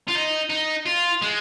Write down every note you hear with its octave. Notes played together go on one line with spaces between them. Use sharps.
F4
D#4
D#4
F4
G#3